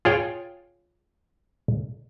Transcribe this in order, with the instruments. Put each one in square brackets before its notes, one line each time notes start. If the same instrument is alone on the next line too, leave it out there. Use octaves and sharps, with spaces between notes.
[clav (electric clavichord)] F4 G#4 C#5 G5